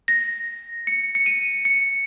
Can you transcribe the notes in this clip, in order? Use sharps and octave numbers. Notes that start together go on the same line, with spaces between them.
A#6
C#7
C#7
D#7
C#7